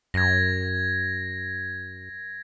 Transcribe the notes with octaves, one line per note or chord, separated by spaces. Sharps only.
F#2 G#6 A#6